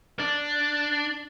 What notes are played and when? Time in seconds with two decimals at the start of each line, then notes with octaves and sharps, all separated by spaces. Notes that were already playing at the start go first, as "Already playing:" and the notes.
0.19 D4